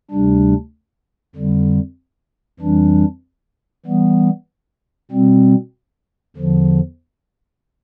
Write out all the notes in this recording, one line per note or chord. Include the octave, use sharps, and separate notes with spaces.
D2 C3 G3 D4
F2 D3 G3
F2 E3 G3 D4
E3 G3 B3
B2 G3 C4
E2 D3 F3